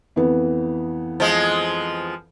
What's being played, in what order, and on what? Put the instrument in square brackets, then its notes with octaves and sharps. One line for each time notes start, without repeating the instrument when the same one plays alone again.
[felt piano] F2 E3 B3
[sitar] F3 G#3